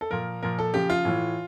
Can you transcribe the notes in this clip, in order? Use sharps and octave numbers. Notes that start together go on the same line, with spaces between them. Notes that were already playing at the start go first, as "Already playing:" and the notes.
A4
A#2 F3 A#4
A#2 F3 A#4
A4
C#3 F3 G4
F4
A2 E3